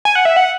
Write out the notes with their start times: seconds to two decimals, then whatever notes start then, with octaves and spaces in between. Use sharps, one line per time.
0.05 G#5
0.15 F#5
0.25 E5
0.37 F#5